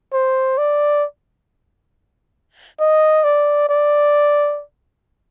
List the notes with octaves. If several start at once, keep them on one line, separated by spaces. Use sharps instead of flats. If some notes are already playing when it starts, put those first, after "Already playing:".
C5
D5
D#5
D5
D5